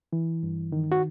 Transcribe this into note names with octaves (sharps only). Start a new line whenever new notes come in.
E3
G2
D#3
F#4